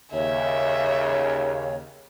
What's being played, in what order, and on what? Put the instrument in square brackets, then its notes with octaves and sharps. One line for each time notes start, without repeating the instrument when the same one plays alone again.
[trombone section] D#2 C#3 [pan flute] C#5 [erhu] E5